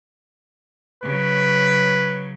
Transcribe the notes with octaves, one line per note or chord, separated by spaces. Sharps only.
C#3 F#3 B4